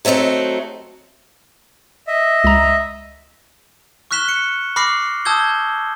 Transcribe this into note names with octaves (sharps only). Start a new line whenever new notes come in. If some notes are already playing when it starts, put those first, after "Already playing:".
F#3 A3 C4 D#4 F#4
D#5 E5
C#2 A#5
C#6 F6 F#6 B6 E7 G7
C#7
B5 D6 F6 A#6 C7
A5 D#6 E6 G6 G#6 G7